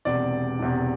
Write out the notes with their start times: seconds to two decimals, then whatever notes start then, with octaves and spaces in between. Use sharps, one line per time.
0.05 E1 E2 C3 D5
0.59 E1 E2 C3